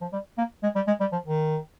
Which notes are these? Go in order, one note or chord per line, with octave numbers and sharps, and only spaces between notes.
F3
G3
A#3
G#3
G3
G#3
G3
F3
D#3